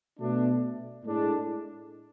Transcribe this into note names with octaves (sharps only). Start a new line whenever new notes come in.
B2 A3 D4
A2 G#3 D4